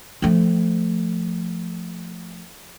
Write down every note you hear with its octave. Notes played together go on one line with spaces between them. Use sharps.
F3 A3